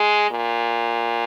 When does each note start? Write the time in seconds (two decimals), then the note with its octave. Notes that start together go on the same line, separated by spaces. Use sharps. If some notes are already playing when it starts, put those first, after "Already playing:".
Already playing: G#3
0.31 A#2